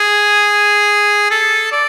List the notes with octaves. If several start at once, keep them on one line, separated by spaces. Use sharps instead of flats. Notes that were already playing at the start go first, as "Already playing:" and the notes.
Already playing: G#4
A4
D5